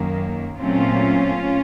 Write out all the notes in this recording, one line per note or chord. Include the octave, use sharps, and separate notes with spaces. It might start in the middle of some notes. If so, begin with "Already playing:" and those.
Already playing: F#2 D#3 A#3
A#2 F#3 A3 C4 C#4 F4